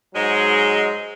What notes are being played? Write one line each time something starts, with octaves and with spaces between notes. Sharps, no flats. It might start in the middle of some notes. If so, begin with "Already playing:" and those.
G#2 F#3 G#3